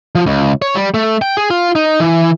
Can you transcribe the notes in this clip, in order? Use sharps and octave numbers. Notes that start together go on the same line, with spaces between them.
F3
C#2
C#5
G3
A3
G5
G#4
F4
D#4
E3